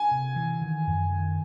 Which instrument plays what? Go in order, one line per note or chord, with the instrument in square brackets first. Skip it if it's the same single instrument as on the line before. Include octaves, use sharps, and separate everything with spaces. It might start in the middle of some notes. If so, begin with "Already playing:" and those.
Already playing: [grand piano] G#5
[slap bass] C3
E3
D#3
F#2
D#3